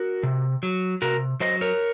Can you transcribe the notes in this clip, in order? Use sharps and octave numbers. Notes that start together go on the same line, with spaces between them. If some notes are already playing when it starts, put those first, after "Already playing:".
Already playing: F#4 A#4
C3
F#3
C3 F#4 A#4
F#3 C5 D#5
A#4 C#5